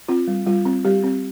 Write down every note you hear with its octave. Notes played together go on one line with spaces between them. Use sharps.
C4 F4
G3
G3 F4
C4
G3 G4
C4